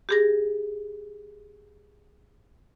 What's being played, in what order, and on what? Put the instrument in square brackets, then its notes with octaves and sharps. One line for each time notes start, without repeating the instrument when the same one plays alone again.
[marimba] G4 G#4 A#6